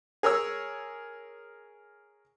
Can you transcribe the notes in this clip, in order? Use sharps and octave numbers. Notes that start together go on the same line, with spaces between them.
G#4 A#4 C#5 E6